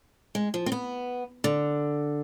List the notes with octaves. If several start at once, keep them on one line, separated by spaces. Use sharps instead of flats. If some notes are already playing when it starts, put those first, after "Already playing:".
G#3
F3
C4
B3
D3